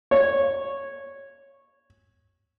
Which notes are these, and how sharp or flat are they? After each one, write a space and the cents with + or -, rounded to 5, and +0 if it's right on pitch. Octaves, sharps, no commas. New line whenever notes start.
C#5 -10